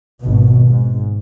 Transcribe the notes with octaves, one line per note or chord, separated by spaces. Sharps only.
G#1 B2
G#2